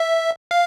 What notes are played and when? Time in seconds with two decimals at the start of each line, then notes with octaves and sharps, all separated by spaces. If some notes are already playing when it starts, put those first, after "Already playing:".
Already playing: E5
0.51 F5